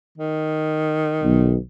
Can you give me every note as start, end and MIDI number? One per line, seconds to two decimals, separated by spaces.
0.18 1.60 51
1.23 1.56 35